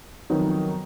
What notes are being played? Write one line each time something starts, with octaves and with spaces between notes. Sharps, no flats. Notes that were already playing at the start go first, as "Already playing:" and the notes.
F2 D#3 F#3 B3 D#4